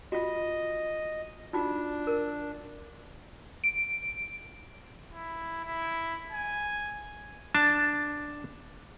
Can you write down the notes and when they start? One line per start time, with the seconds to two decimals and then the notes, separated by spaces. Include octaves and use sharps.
0.12 F4 F#4 D#5
1.53 D4 D#4 F4 F#4
2.07 A#4
3.64 D7
5.14 E4
5.65 E4
6.32 G#5
7.55 D4 A5